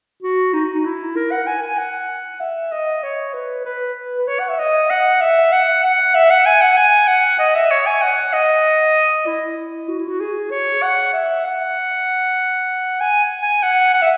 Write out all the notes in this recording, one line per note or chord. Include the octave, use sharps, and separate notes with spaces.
F#4
D#4
D#4
E4
A#4
F#5
G#5
G#5
F#5
E5
D#5
C#5
B4
B4
B4
C#5
F#5
E5
D#5
F#5
E5
F#5
F#5
E5
F#5
G#5
F#5
G#5
F#5
D#5
E5
C#5
G#5
F#5
D#5
E4
F#4
E4
F#4
G#4
C#5
F#5
E5
F#5
G#5
G#5
F#5
F#5
E5